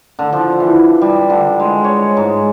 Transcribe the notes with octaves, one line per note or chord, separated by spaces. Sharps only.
D3
F3
E3
G3
D3
G#3
C#5
G#2